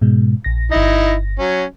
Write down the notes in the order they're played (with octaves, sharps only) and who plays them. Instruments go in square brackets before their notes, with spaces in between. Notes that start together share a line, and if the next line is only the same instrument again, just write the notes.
[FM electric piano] G#2 B2 G#3
A#1 A#6
[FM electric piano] G1 A#6 [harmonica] D#4 E4
[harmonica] F#3 C#4